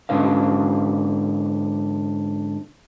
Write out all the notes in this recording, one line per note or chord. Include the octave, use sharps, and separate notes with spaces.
G#2 D3 C#4 B4 F5